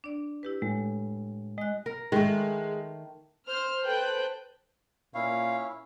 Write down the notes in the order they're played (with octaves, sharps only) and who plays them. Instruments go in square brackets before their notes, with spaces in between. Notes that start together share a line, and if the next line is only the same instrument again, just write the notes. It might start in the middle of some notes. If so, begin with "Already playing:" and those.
[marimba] D4 D5
E4 G4 B4
[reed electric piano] A2 [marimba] G#3
[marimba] G#3 F#6 [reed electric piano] D#5
[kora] A#4
[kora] D#3 A3 [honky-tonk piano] G#3
[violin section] C5 F6
A4 B4 C5 G5 F#6 G6
[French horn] A#2 [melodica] C#4 E4 [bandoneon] F5